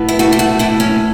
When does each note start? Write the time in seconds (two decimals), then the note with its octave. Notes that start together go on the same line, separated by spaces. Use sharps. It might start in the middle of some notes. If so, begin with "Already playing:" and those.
Already playing: A2 B3
0.09 E4
0.19 A3 F#4
0.32 G4
0.39 F#4
0.59 A2 E4
0.80 C#4